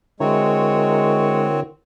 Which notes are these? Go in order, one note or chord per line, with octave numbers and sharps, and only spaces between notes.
D3 G#3 C4 E4 F#4 A#4 C#5